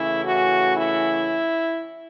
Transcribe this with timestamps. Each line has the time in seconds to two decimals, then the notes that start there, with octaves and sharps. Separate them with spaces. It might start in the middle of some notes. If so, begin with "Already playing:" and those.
Already playing: C#3 E3 A3 C#4 E4
0.24 F#4
0.77 E4